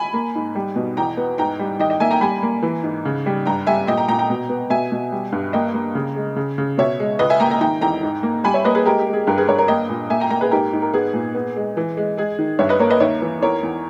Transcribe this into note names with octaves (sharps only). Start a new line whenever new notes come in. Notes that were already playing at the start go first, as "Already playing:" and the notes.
Already playing: G#5 B5
A#3
G#2
G3
B2
E2 G5 A#5
B3
G#2 G5 A#5
G3
D#3 D#5 G5
D#5 G5
A#3 E5 G#5
G5 A#5
G3 G#5 B5
A#3
E3
G#2
C#3
G3
G2 G5 A#5
G3 E5 G#5
A#2 D#5 G5
G5 A#5
A#2 G5 A#5
G5 A#5
B2
B3
B2 E5 G#5
B2
G3
G2
A#3 D#5 G5
A#3
C#3
G#3
C#3
C#3
B2 C#5 E5
G#3
C#2 B4 D#5
E5 G#5
A#3 G5 A#5
G5 A#5
D#3 G5 A#5
E2 G5 A#5
G#2
A#3
G3 G#5 B5
C#5 E5
A#3 B4 D#5
G#4 B4
G#3 G4 A#4
G4
G#3
G#4
G2 G4 A#4
G#4 B4
G2 A#4 C#5
A#4 C#5
A#3 D#5 G5
A#2
A#3 E5 G#5
G5 A#5
A#3 G5 A#5
G#4 B4
G#2 G4 A#4
G#2
A#4
B3 G#4
A#2
B3
G#3
E3
G#3
G#3 G#4
D#3
G2 C#5 E5
B4 D#5
A#3 A#4 C#5
B4 D#5
D#2 C#5 E5
E3
E2 A#4 C#5
E2